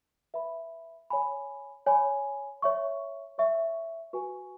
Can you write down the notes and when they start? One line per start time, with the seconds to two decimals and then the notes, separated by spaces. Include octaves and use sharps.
0.34 B4 E5 B5
1.10 C#5 G#5 B5
1.86 C#5 G#5 B5
2.62 C#5 E5 C#6
3.38 C#5 E5 C#6
4.13 F#4 B4 G#5 C#6